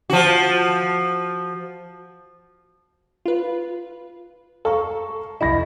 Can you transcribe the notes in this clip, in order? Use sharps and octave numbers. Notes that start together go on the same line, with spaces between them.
F3 F#4
F4 B4
A4 F5 A#5 C#6
C2 F2 E4 D#5 B5 A#6